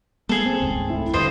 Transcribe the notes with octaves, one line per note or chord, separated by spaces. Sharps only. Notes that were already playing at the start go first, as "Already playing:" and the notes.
G#3 A#3 B3 G#4 A4
C4
D#1 C#2 G#2
A3 E4
D2 G2 F4 C5 D#5